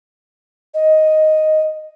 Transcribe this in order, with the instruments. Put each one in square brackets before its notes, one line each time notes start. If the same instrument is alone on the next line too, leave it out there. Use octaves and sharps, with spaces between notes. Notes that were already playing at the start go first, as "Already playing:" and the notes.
[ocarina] D#5